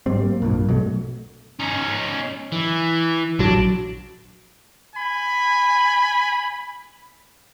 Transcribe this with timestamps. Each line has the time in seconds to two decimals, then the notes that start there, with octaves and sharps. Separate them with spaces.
0.06 G#2 F#3 G3 C4
0.22 A#3
0.42 B1 G2 A#2
0.69 B2 F#3 G3 A3
1.60 C#4 D#4
2.52 E3
3.39 A#1 F#3 D4
4.95 G#5 B5